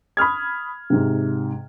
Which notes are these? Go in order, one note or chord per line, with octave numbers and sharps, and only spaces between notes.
B5 D#6 F6 G#6
G#2 C3